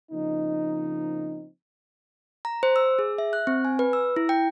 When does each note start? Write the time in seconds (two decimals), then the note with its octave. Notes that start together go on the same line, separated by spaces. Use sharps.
0.11 C#3 F3 A#3 C4 D#4
2.45 A#5
2.63 C5
2.76 E6
2.99 G#4
3.18 E5
3.33 F#6
3.47 C4
3.65 G#5
3.79 B4
3.93 E6
4.16 E4
4.29 G5